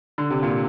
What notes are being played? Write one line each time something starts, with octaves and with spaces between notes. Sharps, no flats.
D3
C3
A#2